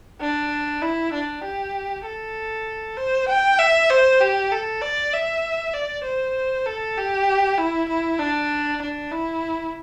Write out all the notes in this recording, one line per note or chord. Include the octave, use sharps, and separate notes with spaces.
D4
E4
D4
G4
A4
C5
G5
E5
C5
G4
A4
D5
E5
D5
C5
A4
G4
E4
E4
D4
D4
E4